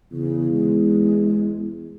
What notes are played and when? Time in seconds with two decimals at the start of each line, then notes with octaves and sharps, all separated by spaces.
0.12 E2 C#3
0.52 G#3